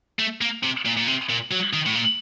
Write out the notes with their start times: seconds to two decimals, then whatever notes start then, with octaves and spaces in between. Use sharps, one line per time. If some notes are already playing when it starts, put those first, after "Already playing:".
0.19 A3
0.41 A#3
0.63 C3
0.85 A#2
0.97 A#2
1.07 C3
1.30 A#2
1.51 F#3
1.73 D#3
1.86 A2
1.95 A#2